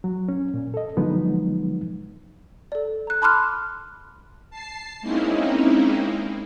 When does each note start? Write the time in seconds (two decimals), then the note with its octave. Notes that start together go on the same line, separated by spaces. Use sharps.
0.04 F#3
0.29 C#4
0.54 A#2
0.74 A4 D#5
0.97 D3 F3 F#3 G#3 B3 D#4
2.72 A4 D5
3.07 A#5 F#6
3.22 A5 B5 C6 D6 F6 F#6
4.50 A5 C7
5.01 G#3 A#3 C4 C#4 D#4 E4